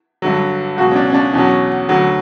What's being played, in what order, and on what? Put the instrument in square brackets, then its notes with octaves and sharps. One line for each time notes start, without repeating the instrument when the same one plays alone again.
[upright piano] G2 D3 F#3
C#2 B2 F#3 F#4
C#4
D4
C#4
D4
E2 B2 F#3 C#4
D2 D3 F#3